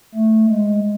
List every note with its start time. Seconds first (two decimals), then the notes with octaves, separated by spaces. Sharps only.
0.15 A3
0.49 G#3